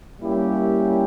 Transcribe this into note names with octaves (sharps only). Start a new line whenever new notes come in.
G3 A#3 C#4 E4 G4